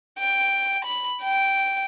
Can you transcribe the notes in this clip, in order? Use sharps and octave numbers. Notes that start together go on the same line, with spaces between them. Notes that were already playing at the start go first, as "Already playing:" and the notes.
G5
B5
G5